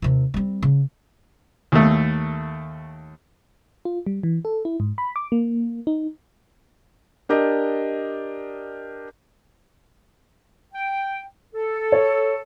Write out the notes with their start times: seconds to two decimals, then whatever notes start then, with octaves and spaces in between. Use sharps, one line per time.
0.02 D#2 C3
0.34 G3 C4
0.62 C#3
1.72 D#2 A3
3.85 F4
4.06 G3
4.23 E3
4.45 A4
4.65 E4
4.80 G#2
4.98 B5
5.16 D6
5.32 A#3
5.87 D#4
7.29 D4 G4 A#4 D5 D#5
10.74 G5
11.55 A4
11.92 C#5